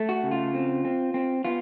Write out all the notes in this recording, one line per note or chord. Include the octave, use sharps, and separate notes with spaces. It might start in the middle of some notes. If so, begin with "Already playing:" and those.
Already playing: A3
F#4
C#3
F4
C4
C4
C4
B3 F4